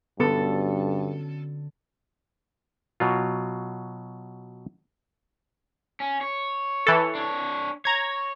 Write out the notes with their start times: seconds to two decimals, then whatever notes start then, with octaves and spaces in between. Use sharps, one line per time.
0.20 G2 D3 F#3 B3 C#4 A4
3.00 B2 F#3 F4
6.00 C#4
6.21 C#5
6.87 E3 A4
7.15 D4 C#5
7.85 C#5 A#5 G#6